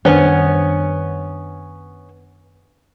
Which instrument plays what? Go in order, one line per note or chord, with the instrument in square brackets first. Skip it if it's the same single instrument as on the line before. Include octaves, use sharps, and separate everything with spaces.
[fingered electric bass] F#2 D#3 G3 [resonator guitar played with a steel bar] B3 C#4 [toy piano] D4 C5